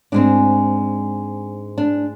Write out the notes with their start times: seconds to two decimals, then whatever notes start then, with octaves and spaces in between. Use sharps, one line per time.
0.12 G#2 G#3 C4 D4
1.78 D4